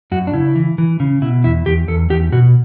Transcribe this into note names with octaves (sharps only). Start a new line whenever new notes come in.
F#2 F#4
D4
C#3 E4
E3
E3
C#3
B2 E4
E2 E4
E2 G4
E2 A4
E2 G4
B2 F#4